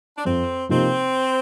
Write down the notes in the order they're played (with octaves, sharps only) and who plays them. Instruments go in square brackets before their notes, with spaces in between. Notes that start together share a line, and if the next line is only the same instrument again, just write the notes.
[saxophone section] D4
[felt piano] F2 [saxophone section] C4
[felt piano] C3 F3 A#3 D#4 [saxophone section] C4